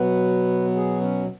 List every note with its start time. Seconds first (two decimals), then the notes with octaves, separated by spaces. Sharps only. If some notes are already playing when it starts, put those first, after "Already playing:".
Already playing: B2 F#3 B3 B4
0.75 G#4
1.01 C#4